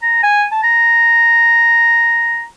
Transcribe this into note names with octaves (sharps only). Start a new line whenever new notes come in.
A#5
G#5
A5
A#5